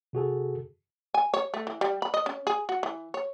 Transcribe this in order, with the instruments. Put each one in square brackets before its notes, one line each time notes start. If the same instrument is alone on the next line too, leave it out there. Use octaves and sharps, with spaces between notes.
[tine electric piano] C3 F#4 G#4 A4
[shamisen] G#5
C#5
A3
E3
G3
B5
D#5
C#4
G#4
F#4
E3
C#5